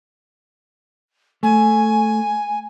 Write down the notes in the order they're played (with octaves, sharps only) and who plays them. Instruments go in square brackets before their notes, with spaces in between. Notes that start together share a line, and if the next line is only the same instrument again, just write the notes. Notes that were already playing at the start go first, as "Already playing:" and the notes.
[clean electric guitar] A3 [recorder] G#5